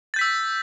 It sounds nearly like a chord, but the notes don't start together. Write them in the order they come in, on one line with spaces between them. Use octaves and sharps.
A6 G6 B6 E6